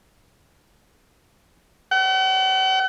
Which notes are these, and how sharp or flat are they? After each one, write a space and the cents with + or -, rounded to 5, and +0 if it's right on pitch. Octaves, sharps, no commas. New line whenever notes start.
F#5 +45